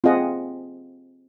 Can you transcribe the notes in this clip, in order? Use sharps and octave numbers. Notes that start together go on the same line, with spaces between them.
C4 F4 G#4 D#5 F#5